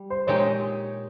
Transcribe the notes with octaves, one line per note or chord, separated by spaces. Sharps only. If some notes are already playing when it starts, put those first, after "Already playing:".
Already playing: G3
C5
A#2 G#3 D#4 G4 C#5